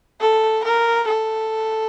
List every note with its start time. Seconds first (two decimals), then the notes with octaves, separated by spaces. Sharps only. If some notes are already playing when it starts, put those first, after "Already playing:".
0.21 A4
0.64 A#4
1.08 A4